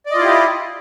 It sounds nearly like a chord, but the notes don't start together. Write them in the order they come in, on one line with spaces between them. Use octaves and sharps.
D5 D#5 F4 E4 G4